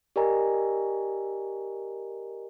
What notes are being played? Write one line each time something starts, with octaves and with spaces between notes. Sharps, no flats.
G4 A#4 D5 D#5 G#5 A#5